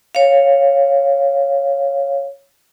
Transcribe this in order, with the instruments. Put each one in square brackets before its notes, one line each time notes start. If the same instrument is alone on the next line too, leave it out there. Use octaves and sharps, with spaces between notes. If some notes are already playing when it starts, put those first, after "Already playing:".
[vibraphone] C#5 F5